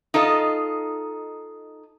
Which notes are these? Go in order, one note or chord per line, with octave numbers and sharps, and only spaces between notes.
D#4 F4 A4 D#5